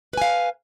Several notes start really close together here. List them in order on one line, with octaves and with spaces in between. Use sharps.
B4 G#5 F5